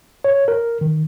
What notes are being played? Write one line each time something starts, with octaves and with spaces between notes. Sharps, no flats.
C#5
A#4
D#3